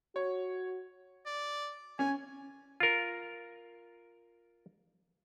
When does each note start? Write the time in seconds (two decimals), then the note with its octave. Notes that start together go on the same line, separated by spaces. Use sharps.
0.16 F#4 C#5
1.26 D5
1.99 C#4 G#5
2.80 F4 A#4